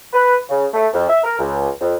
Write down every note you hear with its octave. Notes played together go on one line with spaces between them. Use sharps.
B4
C#3
A3
F2
E5
A#4
C#2
F2